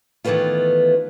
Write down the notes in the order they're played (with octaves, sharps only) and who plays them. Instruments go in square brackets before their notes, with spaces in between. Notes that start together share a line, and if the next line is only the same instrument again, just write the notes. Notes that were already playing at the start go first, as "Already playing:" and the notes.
[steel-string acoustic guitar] D#3 E3 G#3 A3 B3 F4